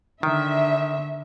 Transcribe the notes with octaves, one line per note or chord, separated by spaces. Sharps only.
D3 D#3 E5